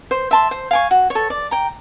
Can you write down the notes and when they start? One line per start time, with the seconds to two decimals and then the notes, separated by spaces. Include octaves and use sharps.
0.11 C5
0.31 E5 A5 C6
0.51 C5
0.71 F5 G#5 C#6
0.91 F#4
1.10 C#5
1.15 A4
1.30 D5
1.51 G5 A#5